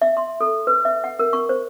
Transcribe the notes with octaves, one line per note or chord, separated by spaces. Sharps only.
E5
C6
A4
B4
E5
F#5
A#4
C#6
C5